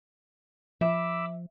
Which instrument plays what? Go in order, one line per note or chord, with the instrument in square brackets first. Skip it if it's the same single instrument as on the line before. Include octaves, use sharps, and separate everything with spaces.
[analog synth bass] F3 [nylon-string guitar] E5 [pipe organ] B5 D6 E6